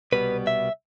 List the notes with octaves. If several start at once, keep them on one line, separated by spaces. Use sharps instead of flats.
C2 B2 G3 B3 B4
E5